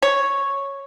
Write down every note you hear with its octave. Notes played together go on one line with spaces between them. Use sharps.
C#5